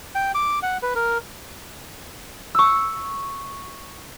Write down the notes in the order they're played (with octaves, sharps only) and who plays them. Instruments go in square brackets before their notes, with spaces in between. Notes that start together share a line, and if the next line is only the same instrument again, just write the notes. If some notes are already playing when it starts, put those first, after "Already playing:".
[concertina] G5
D6
F#5
B4
A#4
[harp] C#6 E6